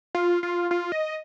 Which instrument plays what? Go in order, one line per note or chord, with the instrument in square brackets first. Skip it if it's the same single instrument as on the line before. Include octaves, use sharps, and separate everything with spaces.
[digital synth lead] F4
F4
F4
D#5